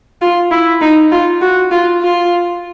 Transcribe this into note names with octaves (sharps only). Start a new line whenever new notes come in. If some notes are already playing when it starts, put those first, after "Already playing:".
F4
E4
D#4
F4
F#4
F4
F4